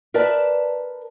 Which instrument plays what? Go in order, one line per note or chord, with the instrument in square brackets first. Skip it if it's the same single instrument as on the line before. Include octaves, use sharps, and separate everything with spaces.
[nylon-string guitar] A#4 B4 D5 E5 A5